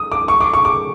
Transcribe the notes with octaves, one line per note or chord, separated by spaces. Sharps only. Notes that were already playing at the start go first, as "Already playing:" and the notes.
Already playing: D#6
D6
C#6
D6
C#6
D6